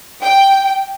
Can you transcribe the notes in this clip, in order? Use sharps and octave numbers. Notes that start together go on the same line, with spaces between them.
G5